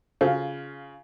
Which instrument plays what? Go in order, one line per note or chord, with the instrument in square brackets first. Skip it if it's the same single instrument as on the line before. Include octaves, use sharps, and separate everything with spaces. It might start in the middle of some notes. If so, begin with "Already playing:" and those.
[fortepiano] C#3 F4 [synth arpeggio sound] F#4 A4 C5